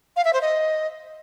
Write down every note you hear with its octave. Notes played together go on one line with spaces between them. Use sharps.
F5
E5
C5
D#5